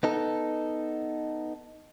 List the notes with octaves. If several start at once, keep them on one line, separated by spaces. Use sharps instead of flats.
B3 D#4 A4